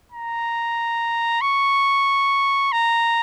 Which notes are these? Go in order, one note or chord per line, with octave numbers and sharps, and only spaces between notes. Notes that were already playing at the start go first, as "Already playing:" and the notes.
A#5
C#6
A#5